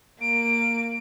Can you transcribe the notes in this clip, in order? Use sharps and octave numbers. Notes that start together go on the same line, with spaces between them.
A#3 D7